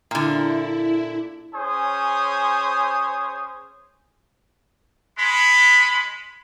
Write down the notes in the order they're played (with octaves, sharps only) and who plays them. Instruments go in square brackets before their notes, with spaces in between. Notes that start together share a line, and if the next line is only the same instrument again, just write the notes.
[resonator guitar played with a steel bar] A#2 D3 [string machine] E4
[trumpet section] C#4 G#4 C5 C#5 G#5 D#6
G#3 B5